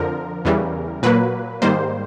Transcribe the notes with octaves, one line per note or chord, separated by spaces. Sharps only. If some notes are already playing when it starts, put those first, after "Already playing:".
Already playing: F2 D3 F3 A#4
E2 C#3 E3 G3
A#2 F#3 A#3 B4
G#2 D#3 G3 A#3 C5